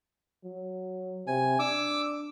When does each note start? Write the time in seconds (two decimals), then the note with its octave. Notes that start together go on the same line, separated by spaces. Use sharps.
0.44 F#3
1.27 C3 G#5
1.59 D4 D6 E6